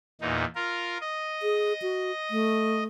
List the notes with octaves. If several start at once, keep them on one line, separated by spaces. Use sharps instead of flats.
E2 A#2 D#4
F4 A#4
D#5
G#4
F#4
A3